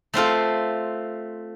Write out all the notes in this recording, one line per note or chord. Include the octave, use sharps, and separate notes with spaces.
A3 C4 F4 A4